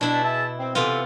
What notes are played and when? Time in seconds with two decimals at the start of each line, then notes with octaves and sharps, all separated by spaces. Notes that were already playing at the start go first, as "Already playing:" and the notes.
0.01 B2 D4 E4 B5
0.23 G#4 E5 A5
0.59 C4
0.75 C3 E3 B3 F4 A4